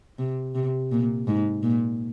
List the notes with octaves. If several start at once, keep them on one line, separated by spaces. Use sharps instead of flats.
C3
C3
A#2
G#2
A#2